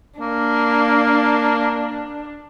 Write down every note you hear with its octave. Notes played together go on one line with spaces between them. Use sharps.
A#3 D4